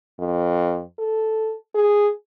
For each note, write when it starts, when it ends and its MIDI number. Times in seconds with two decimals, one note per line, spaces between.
0.19 0.82 41
0.99 1.55 69
1.75 2.08 68